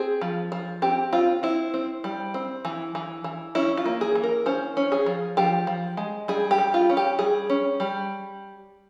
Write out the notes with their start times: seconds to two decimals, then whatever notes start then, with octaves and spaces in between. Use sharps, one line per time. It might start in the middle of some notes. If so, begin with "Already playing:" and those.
Already playing: C4 G#4
0.21 F3
0.52 F3
0.82 C4 G4
1.13 C4 F4
1.43 C4 E4
1.74 C4
2.04 G3
2.34 C4
2.65 E3
2.95 E3
3.24 E3
3.55 C#4 E4
3.77 F4
3.86 A#3
4.01 G#4
4.15 E3
4.24 A#4
4.46 C#4 C5
4.77 C#4
4.92 G#4
5.06 F3
5.37 F3 G4
5.67 F3
5.97 G#3
6.28 G3 G#4
6.51 G4
6.58 G3
6.74 F4
6.90 C#4
6.97 G4
7.19 G3 G#4
7.50 C#4
7.80 G3